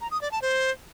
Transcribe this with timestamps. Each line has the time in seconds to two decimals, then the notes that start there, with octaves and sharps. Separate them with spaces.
0.01 A#5
0.11 D#6
0.21 D5
0.32 A5
0.42 C5